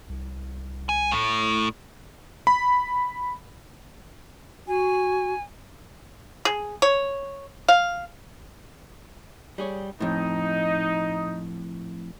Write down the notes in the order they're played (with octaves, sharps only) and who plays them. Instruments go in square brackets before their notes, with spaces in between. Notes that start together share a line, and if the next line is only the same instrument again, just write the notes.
[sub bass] C2
[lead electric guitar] G#5
A2
[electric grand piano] B5
[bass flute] F#4 [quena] G#5
[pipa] G#4
C#5
F5
[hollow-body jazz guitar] G3 G#4 C#5
[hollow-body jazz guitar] F2 A2 [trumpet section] D#4